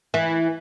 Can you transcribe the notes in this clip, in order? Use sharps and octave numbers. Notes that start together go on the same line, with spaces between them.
E3